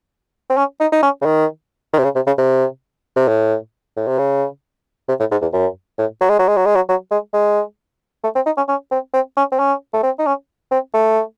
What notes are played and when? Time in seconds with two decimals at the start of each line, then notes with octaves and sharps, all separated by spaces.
0.50 C4
0.57 C#4
0.80 D#4
0.92 D#4
1.03 C#4
1.21 C#3
1.25 D#3
1.93 D#3
1.98 C3
2.04 C#3
2.15 C3
2.27 C#3
2.38 C3
3.16 C3
3.28 A2
3.97 A2
4.08 C3
4.18 C#3
5.08 C3
5.20 A2
5.31 G#2
5.42 E2
5.53 F#2
5.98 A2
6.21 F#3
6.29 G#3
6.39 F#3
6.48 G#3
6.57 F#3
6.66 G#3
6.75 F#3
6.89 F#3
7.11 G#3
7.33 G#3
8.24 A3
8.36 C4
8.46 D#4
8.57 C#4
8.69 C#4
8.92 C4
9.14 C4
9.37 C#4
9.52 C4
9.59 C#4
9.93 A3
10.03 C4
10.19 D#4
10.26 C#4
10.71 C4
10.94 A3